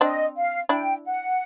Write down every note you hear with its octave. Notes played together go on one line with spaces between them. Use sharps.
C4 D4 D#5
F5
D4 E4 G5
F#5